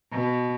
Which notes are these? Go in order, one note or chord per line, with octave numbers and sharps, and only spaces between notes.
B2